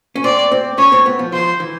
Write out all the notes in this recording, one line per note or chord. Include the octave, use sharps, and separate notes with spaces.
C#4
C4 D5
C4
C#4 C#5
C4
B3
F3
F3 C5
E3